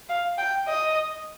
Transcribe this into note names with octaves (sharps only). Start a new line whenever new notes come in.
F5
G5
D#5